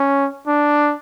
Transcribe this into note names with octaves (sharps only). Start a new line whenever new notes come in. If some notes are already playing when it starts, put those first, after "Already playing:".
Already playing: C#4
D4